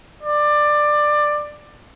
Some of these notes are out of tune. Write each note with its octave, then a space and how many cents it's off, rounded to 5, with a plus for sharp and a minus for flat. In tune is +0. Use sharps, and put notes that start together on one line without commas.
D5 +15